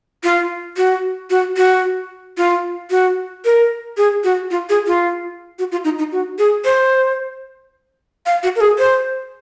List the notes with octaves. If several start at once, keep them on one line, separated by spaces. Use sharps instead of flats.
F4
F#4
F#4
F#4
F4
F#4
A#4
G#4
F#4
F4
G#4
F4
F#4
F4
D#4
D#4
F#4
G#4
C5
F5
F#4
A#4
G#4
C5